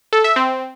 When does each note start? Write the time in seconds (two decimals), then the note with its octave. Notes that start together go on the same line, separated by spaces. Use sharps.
0.13 A4
0.24 E5
0.36 C4